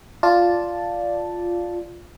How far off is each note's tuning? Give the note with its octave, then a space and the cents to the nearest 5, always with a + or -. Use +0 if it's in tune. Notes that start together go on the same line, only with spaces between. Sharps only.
F4 +0 D5 +0 A5 +0